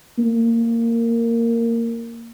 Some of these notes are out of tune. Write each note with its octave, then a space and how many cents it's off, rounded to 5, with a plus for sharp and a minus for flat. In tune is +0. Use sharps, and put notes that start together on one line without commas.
A#3 -15